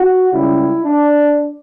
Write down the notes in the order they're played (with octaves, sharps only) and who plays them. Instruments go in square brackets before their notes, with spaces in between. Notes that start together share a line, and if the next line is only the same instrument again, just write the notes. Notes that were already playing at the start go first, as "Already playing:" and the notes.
Already playing: [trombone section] F#4
C#2 C#3 G3 E4
D4